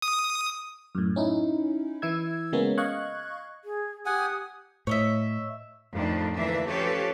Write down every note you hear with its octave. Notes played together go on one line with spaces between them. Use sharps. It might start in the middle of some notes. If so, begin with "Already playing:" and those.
D#6
F#2 A2
C#4 D#4 E4
E3 E4 E6 G#6
C#3 G#3 A#3 B3 C#4
D#5 F5 C#6 F#6 G#6
G#4
G4 F#5 G#5 D#6
A2 C#5 D#5 E5
F2 A2 D#3 F3 D4
D2 E3 A#3 D4 E5
F3 C#4 G4 A4 B4 C#5